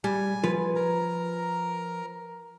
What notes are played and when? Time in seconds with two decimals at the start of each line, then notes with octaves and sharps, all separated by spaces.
0.04 G3 G#5
0.44 F3 B4
0.76 A#4 A#5